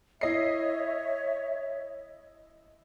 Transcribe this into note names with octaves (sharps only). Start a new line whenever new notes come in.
E4 C#5 D#5 E5 C7